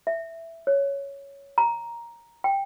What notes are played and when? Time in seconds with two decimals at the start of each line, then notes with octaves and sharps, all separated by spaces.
0.07 E5
0.67 C#5
1.58 A#5
2.44 G5